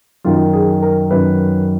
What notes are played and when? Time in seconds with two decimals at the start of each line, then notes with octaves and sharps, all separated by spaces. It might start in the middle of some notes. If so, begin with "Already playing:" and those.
0.24 F#2 D#3 F4
0.53 G#4
0.82 A#4
1.11 F#2 D#3 B4